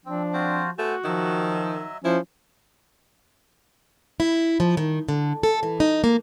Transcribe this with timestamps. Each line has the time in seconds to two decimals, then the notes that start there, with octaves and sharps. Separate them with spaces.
0.06 F3 C4 D4
0.34 C4 F4 F#4 C5
0.78 A3 B3 F#4 C5 G#5
1.04 D#3 F3 F#3 D#5 E5
2.04 F3 C#4 E4
4.20 E4
4.60 F3
4.77 D#3
5.09 D3
5.43 A4
5.63 E3
5.80 D#4
6.04 A#3